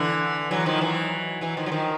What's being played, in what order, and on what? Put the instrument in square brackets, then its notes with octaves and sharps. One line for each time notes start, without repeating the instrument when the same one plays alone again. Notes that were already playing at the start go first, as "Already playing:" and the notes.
Already playing: [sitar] D3 E3
E3 F#3
D#3 F3
E3 F#3
E3 F#3
D#3 F3
F#3
D#3 F3